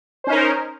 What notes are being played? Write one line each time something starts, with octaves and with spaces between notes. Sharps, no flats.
C#4 D#4 A#4 C5